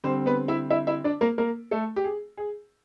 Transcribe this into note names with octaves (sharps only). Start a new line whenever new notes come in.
D3 G3 C4 C5
B3 B4
E4 E5
E4 E5
E4 E5
D4 D5
A#3 A#4
A#3 A#4
A3 A4
G4
G#4
G#4